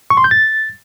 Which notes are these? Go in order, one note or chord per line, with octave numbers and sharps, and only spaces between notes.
C#6
C6
G6
A6